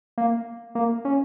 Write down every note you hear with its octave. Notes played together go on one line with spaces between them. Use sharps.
A#3
A#3
C#4